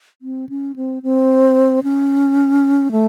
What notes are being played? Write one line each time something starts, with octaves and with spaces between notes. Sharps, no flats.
C4
C#4
C4
C4
C#4
A3